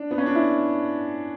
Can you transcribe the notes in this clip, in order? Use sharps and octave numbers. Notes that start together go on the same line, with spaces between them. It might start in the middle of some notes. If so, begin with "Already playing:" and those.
Already playing: D4
B3
C#4
D4
E4